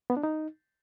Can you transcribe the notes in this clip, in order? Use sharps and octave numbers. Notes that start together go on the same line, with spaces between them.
B3
D4
D#4